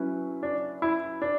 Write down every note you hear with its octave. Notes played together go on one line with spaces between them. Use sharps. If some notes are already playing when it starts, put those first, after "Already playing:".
Already playing: F#3 C#4 E4 B4
D4
E4
D4